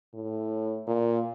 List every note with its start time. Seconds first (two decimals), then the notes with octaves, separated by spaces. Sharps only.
0.14 A2
0.87 A#2